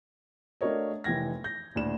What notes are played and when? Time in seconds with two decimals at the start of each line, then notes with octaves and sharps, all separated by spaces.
0.61 A3 D4 F#4 A#4 C#5 D#5
1.04 F1 E3 G5 G#6 A#6
1.44 G6 A#6
1.75 D#1 D2 A2 D4 E7